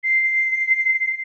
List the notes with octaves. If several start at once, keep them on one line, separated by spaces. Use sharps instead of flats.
C7